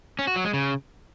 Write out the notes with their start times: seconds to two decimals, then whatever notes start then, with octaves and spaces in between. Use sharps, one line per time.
0.19 C#4
0.27 F#4
0.36 F#3
0.45 G#3
0.53 C#3